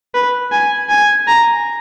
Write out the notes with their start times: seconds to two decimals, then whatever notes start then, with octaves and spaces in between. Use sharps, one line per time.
0.14 B4
0.52 G#5
0.89 G#5
1.27 A#5